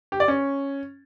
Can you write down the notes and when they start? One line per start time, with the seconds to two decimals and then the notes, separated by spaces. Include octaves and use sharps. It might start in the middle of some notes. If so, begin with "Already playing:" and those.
0.12 G4
0.20 D5
0.28 C#4